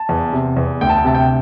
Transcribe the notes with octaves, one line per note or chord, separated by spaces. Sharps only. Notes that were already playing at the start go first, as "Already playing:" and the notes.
Already playing: A5
E2
C3
E2
D2 G5
A5
G5
C3 A5
G5